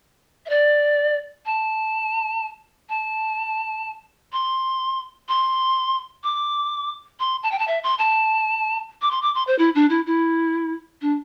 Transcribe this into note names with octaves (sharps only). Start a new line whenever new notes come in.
E5
D5
A5
A5
C6
C6
D6
C6
A5
G5
A5
E5
C6
A5
D6
C6
D6
C6
C5
E4
D4
E4
E4
D4